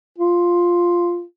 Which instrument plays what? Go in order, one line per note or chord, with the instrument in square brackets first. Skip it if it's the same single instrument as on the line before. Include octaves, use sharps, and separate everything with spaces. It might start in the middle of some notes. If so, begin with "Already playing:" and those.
[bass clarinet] F4